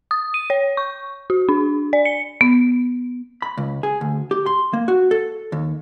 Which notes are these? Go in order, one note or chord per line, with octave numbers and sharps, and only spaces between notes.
D#6
D#7
C#5
C#6
F#4
D4
D5
C#7
B3
B5
C#2
G#4
D2
G4
C6
A#3
F#4
A4
D#2